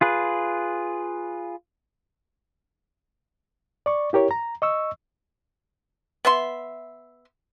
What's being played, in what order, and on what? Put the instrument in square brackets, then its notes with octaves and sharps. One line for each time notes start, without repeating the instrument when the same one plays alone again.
[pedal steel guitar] F4 G#4 B4
[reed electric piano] D5 C#6
E4 G4 A#4 C#5
A#5
D#5 C#6 E6
[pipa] B3 E5 C6